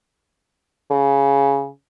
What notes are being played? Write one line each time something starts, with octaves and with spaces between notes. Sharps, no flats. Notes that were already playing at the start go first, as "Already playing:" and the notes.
C#3